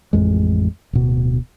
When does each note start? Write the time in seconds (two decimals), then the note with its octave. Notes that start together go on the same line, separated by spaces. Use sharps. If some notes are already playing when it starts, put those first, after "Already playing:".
0.13 A1 F2 G#3
0.93 D1 B2